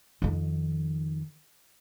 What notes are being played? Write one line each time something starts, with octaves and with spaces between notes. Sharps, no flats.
F2 D#3